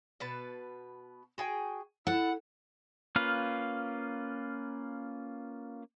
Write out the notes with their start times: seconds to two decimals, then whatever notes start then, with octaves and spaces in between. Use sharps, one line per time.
0.20 B2 B4 A5
1.38 F#4 G#4 G5
2.07 E4 A4 F#5
3.16 A#3 C#4 F4 B4 F5